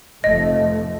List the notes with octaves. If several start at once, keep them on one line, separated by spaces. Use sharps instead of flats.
F1 F3 A3 D#5